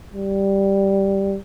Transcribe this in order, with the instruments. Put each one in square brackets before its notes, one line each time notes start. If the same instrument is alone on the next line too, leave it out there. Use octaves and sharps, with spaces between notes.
[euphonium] G3